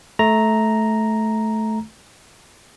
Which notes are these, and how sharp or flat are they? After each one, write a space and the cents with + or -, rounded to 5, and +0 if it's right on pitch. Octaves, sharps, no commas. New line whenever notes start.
A3 -15 A#5 +0